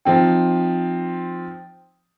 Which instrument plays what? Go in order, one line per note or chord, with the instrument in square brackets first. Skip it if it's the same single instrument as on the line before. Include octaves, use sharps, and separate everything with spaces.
[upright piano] F3 C4 D#4 [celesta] G5